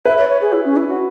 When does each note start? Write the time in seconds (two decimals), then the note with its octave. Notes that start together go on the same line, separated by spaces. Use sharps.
0.05 B4 E5
0.17 C#5
0.29 C#5
0.41 G#4
0.53 E4
0.65 C#4
0.77 E4
0.89 F#4